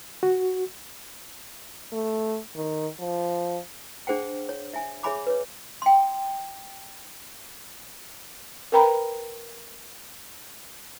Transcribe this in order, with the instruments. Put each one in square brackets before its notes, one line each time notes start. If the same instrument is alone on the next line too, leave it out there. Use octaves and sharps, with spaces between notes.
[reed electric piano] F#4
[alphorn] A3
D#3
F3
[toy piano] D4 G#4 C5 F#5 G5
C#5
E5 G#5
G#4 C#5 E5 G#5 B5 D6
B4 C#5
G5 C6
[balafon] A#4 B4 G5 A#5 B5